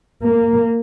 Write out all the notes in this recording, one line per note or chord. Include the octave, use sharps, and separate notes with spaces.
A#3